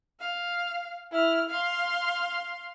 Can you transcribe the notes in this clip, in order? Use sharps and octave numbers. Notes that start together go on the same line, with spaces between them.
F5
E4 F6
F5 C6